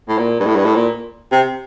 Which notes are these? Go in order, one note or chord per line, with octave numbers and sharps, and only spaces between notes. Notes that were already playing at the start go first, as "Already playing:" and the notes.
A2
A#2
G2
A2
G2
A2
A#2
C3